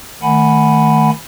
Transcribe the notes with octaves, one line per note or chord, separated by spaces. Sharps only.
D#3 A3 F#5 G#5 B5